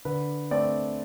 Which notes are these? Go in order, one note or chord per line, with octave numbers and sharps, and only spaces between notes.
D3 B4
A3 C4 D5